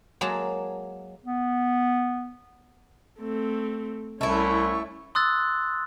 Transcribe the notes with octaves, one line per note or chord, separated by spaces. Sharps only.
F#3 G#3 A#3 A5
B3
A3 C4
C2 A3 C#4 E4 C#6
C6 D#6 E6 F#6 A6